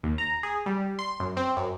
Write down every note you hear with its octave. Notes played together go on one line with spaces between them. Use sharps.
D#2
A#5
G#4
G3
C6
F#2
C4
F#2